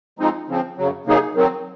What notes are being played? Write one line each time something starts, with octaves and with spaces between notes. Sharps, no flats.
F3 G#3 C4 D#4
C#3 F3 C4
F#2 C#3 F#3
C3 F#3 A#3 D#4 G#4
D#3 F#3 C4